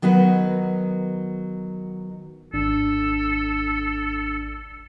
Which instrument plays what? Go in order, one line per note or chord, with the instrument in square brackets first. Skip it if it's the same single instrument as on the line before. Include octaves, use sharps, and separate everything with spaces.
[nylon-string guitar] D#3 F#3 B3 D#4 B4
[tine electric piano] G#1 D4 [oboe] A4